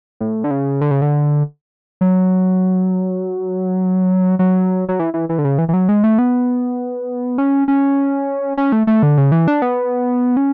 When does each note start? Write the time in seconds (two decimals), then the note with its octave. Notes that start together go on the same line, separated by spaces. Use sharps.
0.21 A2
0.44 D3
0.51 C#3
0.81 D3
0.91 C#3
1.02 D3
2.01 F#3
4.39 F#3
4.89 F#3
4.99 E3
5.14 E3
5.29 E3
5.38 D3
5.44 C#3
5.58 E3
5.69 E3
5.74 F#3
5.89 G#3
6.04 A3
6.19 B3
7.38 C#4
7.68 C#4
8.57 C#4
8.72 A3
8.87 A3
9.03 D3
9.18 C#3
9.32 E3
9.48 D4
9.62 B3
10.37 C#4